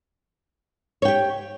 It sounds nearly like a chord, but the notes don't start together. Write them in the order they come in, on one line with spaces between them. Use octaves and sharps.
C#5 G5 G4